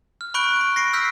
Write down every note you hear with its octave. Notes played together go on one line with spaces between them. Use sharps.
F6
B5 C#6 F#6 G6 D7 G7
B5
A#6 C7 D7
E6 F6 G6 B6 C7